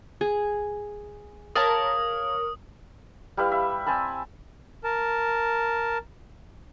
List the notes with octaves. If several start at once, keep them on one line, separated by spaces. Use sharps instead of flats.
G#4
A#4 C#5 F5 A5 D#6
G3 E4 B4 F5
E5
C4 G#5 A5 B5
A#4 A5